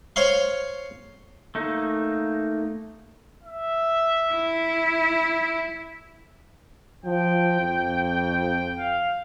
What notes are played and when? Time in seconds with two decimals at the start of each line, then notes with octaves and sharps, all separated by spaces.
0.16 C5 C#5 F5 C6
1.55 A3 A#3 D#4
3.43 E5
4.32 E4
7.05 F3 G5
7.61 F2
8.78 F5